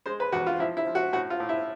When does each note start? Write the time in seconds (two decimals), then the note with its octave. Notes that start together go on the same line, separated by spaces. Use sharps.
0.06 G#3 C5
0.20 B4
0.32 E2 F#4
0.46 F4
0.59 F3 E4
0.77 E4
0.86 F3
0.95 F#4
1.12 A2 F#4
1.30 F4
1.40 A2
1.49 E4